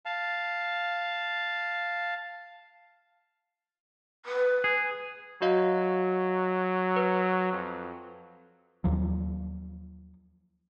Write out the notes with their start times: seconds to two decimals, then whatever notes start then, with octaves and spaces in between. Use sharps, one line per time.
0.05 F5 A5
4.25 B4
4.64 G#4
5.42 F#3 F#4 D#5 F5
6.96 B4
7.53 F2
8.84 D#2 F3 F#3